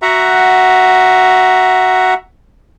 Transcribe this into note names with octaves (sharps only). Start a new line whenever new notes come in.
F#4 E5 F#5 A#5